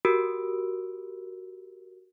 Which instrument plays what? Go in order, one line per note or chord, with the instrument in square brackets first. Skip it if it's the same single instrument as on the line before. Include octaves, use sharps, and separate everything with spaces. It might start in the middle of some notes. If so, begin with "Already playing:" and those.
[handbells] F#4 G4 A#4 E6 D7